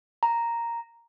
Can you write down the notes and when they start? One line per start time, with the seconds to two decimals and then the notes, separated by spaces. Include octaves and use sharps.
0.23 A#5